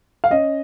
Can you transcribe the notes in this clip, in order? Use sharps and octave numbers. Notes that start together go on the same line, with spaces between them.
F5
C#4 D#5